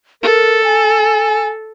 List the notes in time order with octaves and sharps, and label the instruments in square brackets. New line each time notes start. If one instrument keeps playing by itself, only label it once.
[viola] A4 [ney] A#4
[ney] G#5